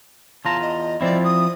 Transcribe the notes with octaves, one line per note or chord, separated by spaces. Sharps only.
E2 F4 A5 A#5
D#5
F3 C4 E4 D5
D#6